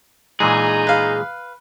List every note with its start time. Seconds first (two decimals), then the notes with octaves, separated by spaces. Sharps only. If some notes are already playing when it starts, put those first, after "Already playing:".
0.40 A#2 E3 G#3 D#4 G#4
0.87 B4 F5